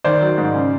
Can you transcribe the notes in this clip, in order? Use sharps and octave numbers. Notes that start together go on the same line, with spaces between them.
D#3 C5 D5
F#3
G#2
C#3